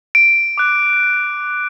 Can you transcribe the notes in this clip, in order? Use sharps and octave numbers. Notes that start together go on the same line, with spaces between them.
D7
D6 F#6